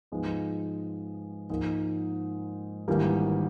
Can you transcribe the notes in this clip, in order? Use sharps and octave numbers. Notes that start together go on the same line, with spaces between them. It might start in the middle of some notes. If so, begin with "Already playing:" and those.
G#2 F3 G#3 B3
G#2 F3 A#3
G#1 G2 E3 G3 A#3